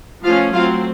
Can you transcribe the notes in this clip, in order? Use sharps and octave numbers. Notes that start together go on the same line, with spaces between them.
F3 A3 C#4 F4 F5
F#3 A3 C4 F4 F5